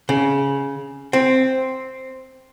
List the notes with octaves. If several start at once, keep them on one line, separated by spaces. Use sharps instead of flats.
C#3
C4